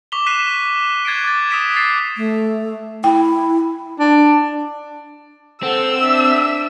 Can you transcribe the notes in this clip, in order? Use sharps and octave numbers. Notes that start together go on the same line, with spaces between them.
C#6 D6 B6 F7 G7
F#6 B6 C7 D#7 E7
F#6 G#6 A6 C7 D7
D6 A6
D#6 E6 B6 D7 E7
A6 C7 F7
A3
E4 G5
D4
C4 A4 F#5 E6
D4 E5